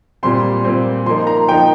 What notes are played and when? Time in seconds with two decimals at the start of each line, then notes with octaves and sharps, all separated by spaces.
0.23 A#2 G3 C4 C6
0.64 A#2 G3 C4
1.06 F3 A#3 D#4 C6
1.27 A#5
1.48 F3 A#3 D#4 G5